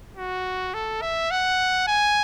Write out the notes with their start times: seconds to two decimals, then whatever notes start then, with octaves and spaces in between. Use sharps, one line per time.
0.17 F#4
0.74 A4
1.02 E5
1.31 F#5
1.88 G#5